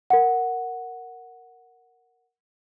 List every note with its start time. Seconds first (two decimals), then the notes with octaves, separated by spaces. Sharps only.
0.10 A#4 F#5